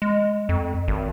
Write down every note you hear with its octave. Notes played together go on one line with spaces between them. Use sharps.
G#3
F2
G#1